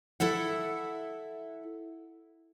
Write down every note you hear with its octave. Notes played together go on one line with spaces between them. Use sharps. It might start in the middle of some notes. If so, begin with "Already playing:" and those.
E4 A4 E5 F#5